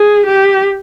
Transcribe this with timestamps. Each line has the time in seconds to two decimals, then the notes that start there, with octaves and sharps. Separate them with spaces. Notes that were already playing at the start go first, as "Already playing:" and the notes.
Already playing: G#4
0.26 G4